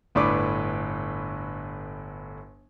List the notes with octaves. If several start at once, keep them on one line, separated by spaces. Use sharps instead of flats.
G1 A2 D4 B4 D6